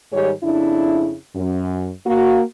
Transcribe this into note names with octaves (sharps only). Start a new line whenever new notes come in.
G#2 D#3 G3 G4 G#4 C#5
F2 C#3 D4 E4
F#2
A#3 F#4